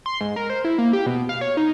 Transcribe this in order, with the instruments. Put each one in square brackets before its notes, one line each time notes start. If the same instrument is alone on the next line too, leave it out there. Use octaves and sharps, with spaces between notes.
[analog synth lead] C6
G#2
A#4
C5
E4
A#3
G4
B2
F5
C#5
D#4